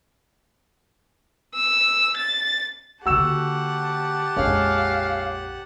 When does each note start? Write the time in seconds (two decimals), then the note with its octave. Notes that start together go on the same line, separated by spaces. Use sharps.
1.56 E6
2.17 A6
3.06 D3 A#3 F#4 G4 F#5 A5 E6 E7
4.36 A#1 F2 G#3 C#4 F5